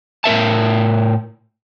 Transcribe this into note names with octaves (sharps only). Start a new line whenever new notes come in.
A2 A#4 E5 A5